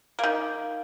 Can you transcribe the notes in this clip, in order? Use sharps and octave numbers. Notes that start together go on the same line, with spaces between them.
D#3 A#3